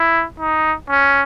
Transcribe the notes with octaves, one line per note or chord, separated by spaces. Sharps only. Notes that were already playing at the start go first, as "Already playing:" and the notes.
Already playing: E4
D#4
C#4